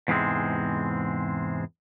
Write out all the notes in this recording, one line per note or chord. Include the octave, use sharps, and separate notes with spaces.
E2 G#2 C3 G#3 C4